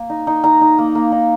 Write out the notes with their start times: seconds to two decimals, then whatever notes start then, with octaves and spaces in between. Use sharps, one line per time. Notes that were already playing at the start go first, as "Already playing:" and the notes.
Already playing: A#3
0.10 D#4
0.27 D#4
0.44 D#4 A#5
0.61 D#4
0.78 A#3
0.95 A#3
1.12 D#4